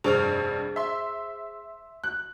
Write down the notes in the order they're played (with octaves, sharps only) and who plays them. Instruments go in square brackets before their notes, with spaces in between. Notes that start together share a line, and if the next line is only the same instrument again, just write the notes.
[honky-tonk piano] F1 G2 [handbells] G#4 C5 F6
[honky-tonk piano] E5 C6
F#6